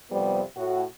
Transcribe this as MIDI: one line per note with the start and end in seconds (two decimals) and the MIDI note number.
0.11 0.41 41
0.11 0.41 48
0.11 0.41 55
0.11 0.41 59
0.11 0.41 72
0.57 0.84 45
0.57 0.84 66